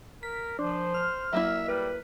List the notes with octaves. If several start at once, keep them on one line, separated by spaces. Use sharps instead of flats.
A#4 B6
F3 D4 C5
F6
F#3 A#3 E4 E5
G3 B4